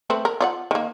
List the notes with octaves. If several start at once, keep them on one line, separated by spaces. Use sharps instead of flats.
A3 C4 B4
A#4
F4 D5 F#5
D#3 A#3